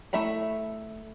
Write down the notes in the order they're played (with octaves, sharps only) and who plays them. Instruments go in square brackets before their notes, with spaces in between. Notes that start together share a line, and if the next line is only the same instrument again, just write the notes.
[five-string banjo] A3 E4 E5 A#5 B5